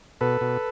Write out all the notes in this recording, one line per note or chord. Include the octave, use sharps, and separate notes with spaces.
B2 A4 B4
B2